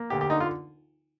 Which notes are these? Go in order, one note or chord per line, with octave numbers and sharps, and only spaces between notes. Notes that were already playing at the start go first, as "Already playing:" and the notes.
Already playing: A#3
D2 G4
G4
D3 D#4
F4